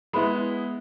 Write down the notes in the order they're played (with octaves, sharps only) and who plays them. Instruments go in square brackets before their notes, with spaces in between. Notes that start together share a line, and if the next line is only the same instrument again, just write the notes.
[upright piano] G#3 B3 E4 [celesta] B5